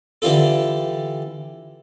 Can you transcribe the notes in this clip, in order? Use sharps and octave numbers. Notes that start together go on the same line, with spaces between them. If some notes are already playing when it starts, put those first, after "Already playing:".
D3 E3 G3 F4 A4